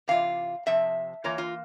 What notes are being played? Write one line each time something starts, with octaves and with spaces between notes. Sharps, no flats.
C3 E3 F4 F5
C3 F3 E5
E3 A#3 F4 C#5
F4